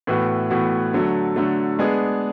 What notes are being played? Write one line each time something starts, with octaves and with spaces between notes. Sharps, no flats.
A2 E3 B3 F#4
A2 E3 B3 F#4
D3 F#3 A3
D3 F#3 A3
G#3 B3 D4 G#4